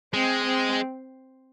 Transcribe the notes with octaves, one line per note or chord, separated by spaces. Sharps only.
G#3 C4
C4